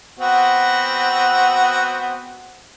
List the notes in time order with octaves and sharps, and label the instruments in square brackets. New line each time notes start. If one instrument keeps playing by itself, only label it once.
[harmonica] B3 C4 F#4